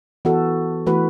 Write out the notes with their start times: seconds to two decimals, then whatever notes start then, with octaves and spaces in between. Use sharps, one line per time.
0.25 E3 B3 F#4 A4
0.86 E3 A3 F#4 B4